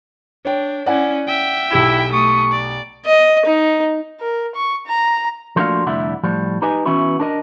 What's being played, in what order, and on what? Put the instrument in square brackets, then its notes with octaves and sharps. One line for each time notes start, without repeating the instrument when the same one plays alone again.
[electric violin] D4 [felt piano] C#5 G5
[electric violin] C#4 E4 [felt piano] D5 F#5 G#5
[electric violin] E5 G5
[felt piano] B1 G4 E7 [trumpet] E4
[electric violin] A3 D#6 [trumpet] C#6
[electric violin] D5
[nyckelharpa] D#5
D#4
[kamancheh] A#4
C#6
A#5
[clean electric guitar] F3 A3 A#3 D4 F#4 F5
C2 F2 D3 A3 E4 F#5
A2 F3 G3
D#4 G4 B4 D#5 G#5
E3 B3 C#4 E4 F#4
D4 A#4 D#5